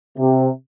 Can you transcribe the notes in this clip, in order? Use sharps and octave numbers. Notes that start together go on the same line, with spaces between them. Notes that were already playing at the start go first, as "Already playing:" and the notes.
C3